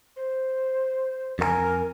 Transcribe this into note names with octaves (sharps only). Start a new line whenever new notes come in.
C5
F2 F#4 A#4 G#5